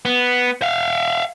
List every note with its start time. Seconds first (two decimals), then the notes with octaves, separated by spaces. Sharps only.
0.05 B3
0.62 E5 F5